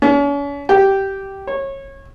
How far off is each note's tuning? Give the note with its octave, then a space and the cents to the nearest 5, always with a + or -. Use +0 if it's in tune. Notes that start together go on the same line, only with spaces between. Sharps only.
C#4 +40
G4 -10
C#5 -25